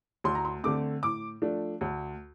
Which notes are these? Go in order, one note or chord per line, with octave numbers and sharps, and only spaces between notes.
D2 C6
A#5
C6
D3 A3 C4 D6
A2 D6
F3 A3 D4
D2